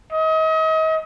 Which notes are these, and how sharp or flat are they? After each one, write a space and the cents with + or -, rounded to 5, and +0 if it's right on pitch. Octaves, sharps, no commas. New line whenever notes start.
D#5 +35